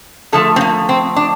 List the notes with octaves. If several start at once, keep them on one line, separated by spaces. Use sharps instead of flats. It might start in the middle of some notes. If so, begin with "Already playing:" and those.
D3 F3 A3 A4
C4
A#3
C4
D4